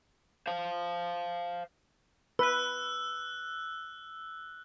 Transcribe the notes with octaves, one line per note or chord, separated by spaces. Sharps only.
C5 F5
B4 E6 F#6